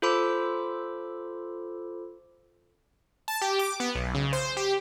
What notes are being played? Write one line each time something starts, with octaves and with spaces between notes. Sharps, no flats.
F4 A4 C5 B5 D6 E6
A5
G4
D6
B3
B1
C#3
C5
G4